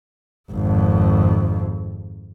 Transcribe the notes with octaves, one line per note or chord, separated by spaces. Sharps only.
G#1 F2